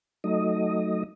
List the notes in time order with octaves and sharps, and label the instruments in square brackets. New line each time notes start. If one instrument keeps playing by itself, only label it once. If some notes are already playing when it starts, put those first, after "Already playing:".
[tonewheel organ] F#3 A3 D#4 D#5